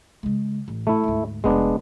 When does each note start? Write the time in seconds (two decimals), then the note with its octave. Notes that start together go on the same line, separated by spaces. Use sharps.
0.23 C#3 G#3
0.68 A1
0.87 A3 E4
1.04 D2 G#2
1.44 F1 F2 G#3 B3 D4